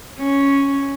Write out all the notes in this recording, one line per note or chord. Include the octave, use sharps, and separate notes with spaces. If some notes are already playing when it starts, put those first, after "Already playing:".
C#4